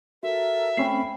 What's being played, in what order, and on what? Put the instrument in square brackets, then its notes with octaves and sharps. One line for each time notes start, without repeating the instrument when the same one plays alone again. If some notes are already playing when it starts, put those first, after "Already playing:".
[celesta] F#4 [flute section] A4 A#4 [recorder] E5
[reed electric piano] A3 C4 C#4 [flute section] G5 B5 [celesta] C7